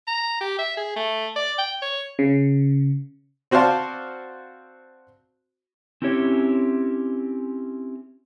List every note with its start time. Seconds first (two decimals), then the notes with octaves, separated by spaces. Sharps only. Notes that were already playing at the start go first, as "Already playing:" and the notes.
0.08 A#5
0.41 G4
0.59 E5
0.77 G#4
0.96 A3
1.36 D5
1.58 G5
1.82 C#5
2.19 C#3
3.51 C4 F#4 C5 D5 F5 A5
6.02 C4 C#4 E4 G4 C#5